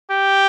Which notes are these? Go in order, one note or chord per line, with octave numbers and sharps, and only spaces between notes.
G4